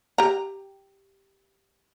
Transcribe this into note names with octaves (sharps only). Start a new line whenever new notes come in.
G4 A#5